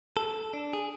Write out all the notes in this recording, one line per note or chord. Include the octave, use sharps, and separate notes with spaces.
A4
D4
G#4